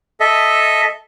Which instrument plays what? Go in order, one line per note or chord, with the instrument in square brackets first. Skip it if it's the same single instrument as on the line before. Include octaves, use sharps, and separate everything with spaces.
[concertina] A4 D#5 E5